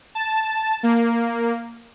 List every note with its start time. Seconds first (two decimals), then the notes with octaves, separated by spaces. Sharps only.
0.15 A5
0.83 A#3